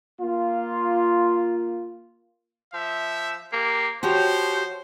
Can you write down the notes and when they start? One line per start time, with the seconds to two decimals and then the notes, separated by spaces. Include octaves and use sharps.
0.21 A#3 F4
2.74 F3 E5
3.53 A#3 G4
4.03 F3 F#4 G4 C5 C#5